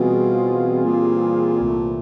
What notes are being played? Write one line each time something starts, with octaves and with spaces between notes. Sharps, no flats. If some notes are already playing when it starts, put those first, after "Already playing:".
Already playing: B2 E3 G3 C4 F4 G#4
A#2
C2 C3 E3 A3